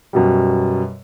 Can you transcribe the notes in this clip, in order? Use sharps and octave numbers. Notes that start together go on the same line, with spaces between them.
F#2 B2 G3